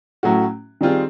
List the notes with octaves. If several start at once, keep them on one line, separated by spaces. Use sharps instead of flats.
A2 F#3 A3 C#4 F#4
D#3 G3 C4 F4 G#4